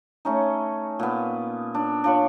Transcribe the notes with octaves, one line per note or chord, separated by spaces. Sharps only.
A3 C#4 D#4
A#2 B3
D4
D4 F4 C#5